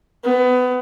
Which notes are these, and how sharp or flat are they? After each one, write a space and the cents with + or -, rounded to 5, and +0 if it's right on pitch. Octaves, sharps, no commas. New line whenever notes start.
B3 +25